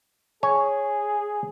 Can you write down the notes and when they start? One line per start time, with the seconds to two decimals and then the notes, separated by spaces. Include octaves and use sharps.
0.43 G#4 C#5 G#5